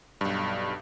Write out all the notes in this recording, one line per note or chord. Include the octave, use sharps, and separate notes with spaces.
B1 G2